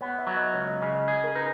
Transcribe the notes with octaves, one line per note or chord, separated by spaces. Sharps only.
B3 C#5
E5
F#3
D#5
C#2 C#5
D#5
C#3 D#5
D#5
G#4 D#5
A#4
D#4 B4